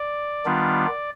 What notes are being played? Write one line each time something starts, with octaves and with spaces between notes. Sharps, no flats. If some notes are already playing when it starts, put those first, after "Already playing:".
Already playing: D5
D#3 G3 B3 D4 F4